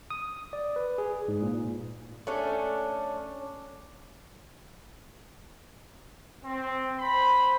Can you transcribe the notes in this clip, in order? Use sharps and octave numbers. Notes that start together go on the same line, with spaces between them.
D#6
D5
B4
G#4
G#2
A#2
A3 C#4 D4
C4
C5 B5